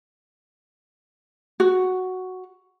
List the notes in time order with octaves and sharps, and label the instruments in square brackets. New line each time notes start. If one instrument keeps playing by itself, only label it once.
[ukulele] F#4